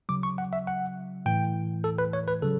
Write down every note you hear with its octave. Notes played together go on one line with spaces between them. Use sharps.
C#3 F#3 D6
C#6
F#5
E5
F#5
A2 E3 G5
A4
B4
C#5
B4
C#3 F#3 A4